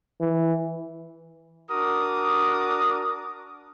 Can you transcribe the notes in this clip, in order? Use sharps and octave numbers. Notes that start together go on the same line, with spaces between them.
E3
D4 F#4 A#4 D6 D#6